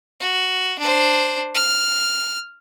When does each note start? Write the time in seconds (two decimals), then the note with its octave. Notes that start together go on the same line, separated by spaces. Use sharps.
0.20 F#4
0.79 D4 C5
1.55 F6